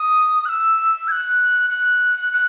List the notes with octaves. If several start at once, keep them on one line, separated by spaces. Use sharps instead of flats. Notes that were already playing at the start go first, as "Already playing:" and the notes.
Already playing: D#6
F#6
E6
G#6
F#6
F#6
F#6